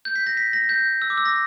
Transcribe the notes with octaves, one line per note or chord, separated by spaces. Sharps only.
G6
B6
A#6
B6
A#6
G6
E6
D6
E6
A#6